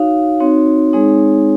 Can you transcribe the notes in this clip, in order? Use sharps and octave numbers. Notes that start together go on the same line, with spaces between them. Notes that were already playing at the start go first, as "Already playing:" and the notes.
Already playing: D#4 F#4 C#5 F5
C4 D#4 F#4 C#5
G#3 C4 D#4 G#4 C#5